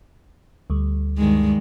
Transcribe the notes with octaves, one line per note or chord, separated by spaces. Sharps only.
D2 G3
G2 D#3 G#3